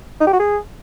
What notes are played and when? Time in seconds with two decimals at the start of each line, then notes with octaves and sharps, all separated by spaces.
0.20 D#4
0.27 G4
0.33 F#4
0.39 G#4